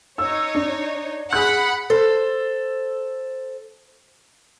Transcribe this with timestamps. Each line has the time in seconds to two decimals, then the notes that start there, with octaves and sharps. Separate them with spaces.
0.18 D#4 C#5 E6
0.55 D4
1.33 G#4 F#5 B5 F#6
1.90 A4 C5